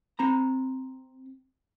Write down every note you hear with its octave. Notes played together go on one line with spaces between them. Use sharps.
C4 A#5 B5